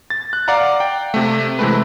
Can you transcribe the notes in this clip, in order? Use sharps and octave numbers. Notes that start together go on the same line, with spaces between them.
A6
F#6
D5 F5 F#5 A#5
G5
C3 A3
C3 E3 G#3 A3 C4 B4